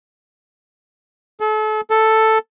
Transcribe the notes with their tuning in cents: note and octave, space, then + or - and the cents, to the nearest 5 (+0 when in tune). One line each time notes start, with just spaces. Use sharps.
A4 -35
A4 +5